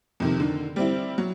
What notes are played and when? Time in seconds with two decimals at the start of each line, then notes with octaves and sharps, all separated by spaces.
0.20 F2 C3 D#3
0.40 D3 D#3
0.76 G3 C4 E4
1.18 F#3